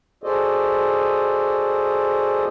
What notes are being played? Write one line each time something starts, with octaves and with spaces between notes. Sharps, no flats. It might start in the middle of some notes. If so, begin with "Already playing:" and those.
F#4 G#4 A4 C5 D5 D#5